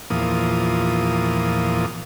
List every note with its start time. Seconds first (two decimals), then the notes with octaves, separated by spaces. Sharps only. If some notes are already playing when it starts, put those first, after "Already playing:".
0.10 E2 A#2 F3 D#6